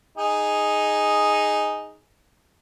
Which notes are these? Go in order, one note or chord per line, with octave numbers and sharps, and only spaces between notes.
D#4 G#4